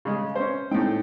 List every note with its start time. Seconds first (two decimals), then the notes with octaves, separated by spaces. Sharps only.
0.05 C#3 G#3
0.36 C#4 C5
0.71 A2 G#3 C4 D#4 G5